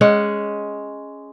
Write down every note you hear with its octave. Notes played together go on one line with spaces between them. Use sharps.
G#3 C#4 F#5